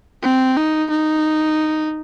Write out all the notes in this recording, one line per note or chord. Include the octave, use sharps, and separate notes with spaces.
C4
D#4
D#4